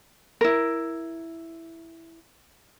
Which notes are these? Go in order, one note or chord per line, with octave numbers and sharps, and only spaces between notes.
E4 A#4